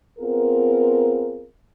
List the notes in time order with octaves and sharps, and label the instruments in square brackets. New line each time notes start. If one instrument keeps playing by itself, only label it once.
[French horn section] B3 C4 F4 G#4 A#4